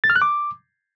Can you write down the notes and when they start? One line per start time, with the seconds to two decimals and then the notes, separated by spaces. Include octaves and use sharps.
0.04 A6
0.10 F6
0.16 F#6
0.22 D6